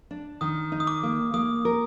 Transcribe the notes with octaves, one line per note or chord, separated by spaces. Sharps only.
D4
D#3 D#6
D#4
D#6
D6
A#3
A#3 D#6
A#4